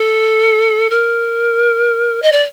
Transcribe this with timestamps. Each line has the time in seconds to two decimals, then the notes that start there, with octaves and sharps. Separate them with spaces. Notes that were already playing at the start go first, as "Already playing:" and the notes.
Already playing: A4
0.90 A#4
2.22 D#5
2.32 D5